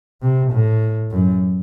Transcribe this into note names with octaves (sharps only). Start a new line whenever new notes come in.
C3
A2
F#2